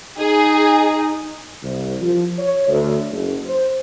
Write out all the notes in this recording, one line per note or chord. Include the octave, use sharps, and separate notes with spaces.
D#4 G#4
C2
F3
C#5
D2
F#1
C5